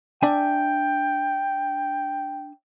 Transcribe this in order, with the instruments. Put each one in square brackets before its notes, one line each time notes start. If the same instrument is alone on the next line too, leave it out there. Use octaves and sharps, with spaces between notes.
[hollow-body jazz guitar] D4 E5 G#5 [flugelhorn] G5